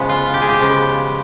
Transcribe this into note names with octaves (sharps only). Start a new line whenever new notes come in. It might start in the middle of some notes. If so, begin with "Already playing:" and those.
Already playing: C#3 F3 G#3 B3
F4
G4
G#4
G4
C#3 F3 G#3 B3